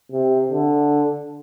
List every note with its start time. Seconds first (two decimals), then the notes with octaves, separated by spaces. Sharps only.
0.12 C3
0.51 D3